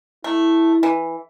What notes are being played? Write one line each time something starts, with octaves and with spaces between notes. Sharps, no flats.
A3 E4
E3